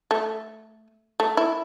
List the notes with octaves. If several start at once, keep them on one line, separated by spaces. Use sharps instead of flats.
A3
A3
E4